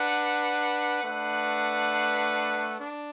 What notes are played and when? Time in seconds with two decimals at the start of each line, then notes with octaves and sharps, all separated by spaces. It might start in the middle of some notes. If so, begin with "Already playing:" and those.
Already playing: D4 B4 F#5
1.02 A3 D4 B4 F#5
2.80 D4